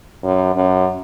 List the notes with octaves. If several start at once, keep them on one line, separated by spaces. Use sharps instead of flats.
F#2
F#2